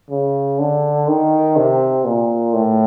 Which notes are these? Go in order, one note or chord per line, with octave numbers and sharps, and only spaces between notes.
C#3
D3
D#3
C3
A#2
A2